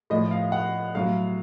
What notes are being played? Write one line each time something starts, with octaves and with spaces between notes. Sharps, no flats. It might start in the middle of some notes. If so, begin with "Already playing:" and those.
A2 F3 D#5
F5
F#5
A2 F#3 F5